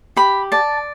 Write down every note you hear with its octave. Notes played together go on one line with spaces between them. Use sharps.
G4 B5
D5 A5